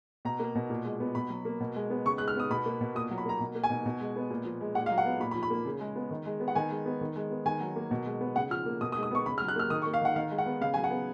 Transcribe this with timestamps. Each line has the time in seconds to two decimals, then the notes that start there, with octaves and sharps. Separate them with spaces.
0.25 B2 A#5
0.40 A#3
0.55 B2
0.70 A#2
0.85 G#3
1.00 B3
1.15 B2 B5
1.30 F#3
1.45 A#3
1.60 B2
1.76 G#3
1.90 B3
2.06 C#3 C#6
2.18 G#3 F#6
2.28 F6
2.35 B3 D#6
2.50 B2 B5
2.66 A#3
2.81 B2
2.95 A#2 D#6
3.11 F#3
3.18 B5
3.25 A#3 A#5
3.40 B2
3.55 A#3
3.63 G#5
3.70 B2
3.86 B2
4.00 G#3
4.16 B3
4.30 A#2
4.45 F3
4.61 G#3
4.75 A#2 F#5
4.86 F5
4.90 F#3
4.98 F#5
5.06 B3
5.20 A#2 B5
5.31 B5
5.35 F3
5.43 B5
5.50 A#3
5.65 C#3
5.80 G#3
5.96 B3
6.11 D#3
6.26 G#3
6.40 B3
6.48 F#5
6.55 D#3 G#5
6.70 G#3
6.86 B3
7.01 D#3
7.16 G#3
7.31 B3
7.46 D#3 G#5
7.60 F#3
7.76 A#3
7.91 B2
8.06 G#3
8.21 B3
8.36 C#3 F#5
8.50 F3 F6
8.66 A#3
8.81 B2 D#6
8.92 D#6
8.96 G#3
9.03 D#6
9.11 B3 C#6
9.26 C#3 B5
9.38 F6
9.41 F#3
9.48 F#6
9.56 A#3 F6
9.70 D#3 D#6
9.82 C#6
9.86 A#3
9.94 F5
10.02 D#3 F#5
10.16 D#3 F5
10.31 G#3
10.38 F#5
10.46 B3
10.61 C#3 F5
10.74 F#3 G#5
10.84 F#5
10.90 B3